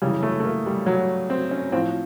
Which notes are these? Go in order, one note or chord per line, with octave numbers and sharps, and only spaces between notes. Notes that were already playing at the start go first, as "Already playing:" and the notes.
F#2 C#3 E3 G3
A3
A3
A#3
G3
F#3
C4
C#4
A2 F3 C4